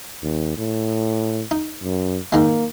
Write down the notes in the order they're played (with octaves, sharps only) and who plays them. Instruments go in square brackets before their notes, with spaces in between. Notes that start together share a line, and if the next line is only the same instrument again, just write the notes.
[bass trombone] D#2
A2
[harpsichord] D#4
[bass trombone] F#2
[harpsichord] G#2 D#3 G#3 [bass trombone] A#3